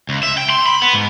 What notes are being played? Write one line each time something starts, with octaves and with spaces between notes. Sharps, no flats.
C#2
E5
G5
C6
B5
B3
G#2